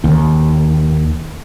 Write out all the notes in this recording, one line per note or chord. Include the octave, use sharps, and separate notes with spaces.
D#2